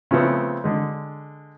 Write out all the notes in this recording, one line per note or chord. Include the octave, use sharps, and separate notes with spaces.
C#3 F3 A3 B3 C4
D3 G#3